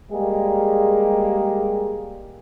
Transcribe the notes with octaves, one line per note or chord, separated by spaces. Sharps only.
G3 G#3 A#3 G4 G#4